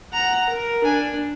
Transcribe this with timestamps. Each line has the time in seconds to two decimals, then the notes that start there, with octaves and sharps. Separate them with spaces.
0.13 F#5 A#5
0.49 A#4
0.84 D4 G#5